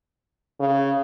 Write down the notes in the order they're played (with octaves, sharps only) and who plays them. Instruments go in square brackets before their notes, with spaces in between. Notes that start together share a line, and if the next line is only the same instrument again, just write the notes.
[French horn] C#3